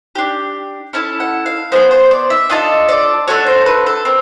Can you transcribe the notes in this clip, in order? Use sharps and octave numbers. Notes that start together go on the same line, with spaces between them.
D4 G4
C#4 E4 A4 A5
F#5
F5
B3 E4 G#4 C5
C5
D5
E5
D4 F4 A4 D#5
D5
A3 D4 F#4 A4 C#5
C5
B4
A4
C4 A#4